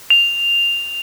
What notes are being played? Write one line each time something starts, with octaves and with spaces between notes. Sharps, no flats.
F7